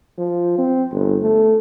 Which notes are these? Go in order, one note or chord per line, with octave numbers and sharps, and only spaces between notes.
F3
C4
G1
A3